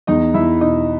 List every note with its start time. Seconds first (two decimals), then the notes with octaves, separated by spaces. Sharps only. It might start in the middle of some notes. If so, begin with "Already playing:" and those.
0.07 E2 D#4 D#5
0.34 E2 E4 E5
0.61 B2 D#4 D#5